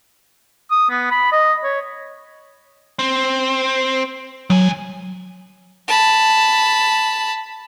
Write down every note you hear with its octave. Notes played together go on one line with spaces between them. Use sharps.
D#6
B3
B5
D#5
C#5
C4
D#3 F#3 G#5
A5 B5